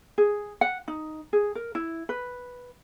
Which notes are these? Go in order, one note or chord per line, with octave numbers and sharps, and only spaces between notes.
G#4
F#5
D#4
G#4
A#4
E4
B4